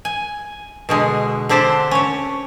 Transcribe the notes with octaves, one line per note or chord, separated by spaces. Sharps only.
G#5
B2 D3 G#3
D3 C4 G4 C5 A5
C#4 C#5